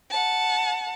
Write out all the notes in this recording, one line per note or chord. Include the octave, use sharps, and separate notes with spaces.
F#5 A5